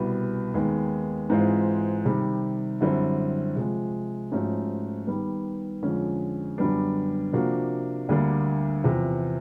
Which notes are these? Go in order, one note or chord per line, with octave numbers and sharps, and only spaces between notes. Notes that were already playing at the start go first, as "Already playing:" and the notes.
Already playing: C2 B2 G3 B3
D#2 D#3 G#3 B3
G#2 E3 G#3 C4 F4
C3 D#3 G3
F#2 D3 G3 C4 E4
C3 F3 G#3
G#2 F3 A3 C#4 F#4
D#3 G3 B3
F2 D3 F3 G#3 C#4
F#2 D3 G3 B3 D4
C3 F3 A#3 D4 F#4
D2 D3 G3 A#3 D4
E2 C3 F3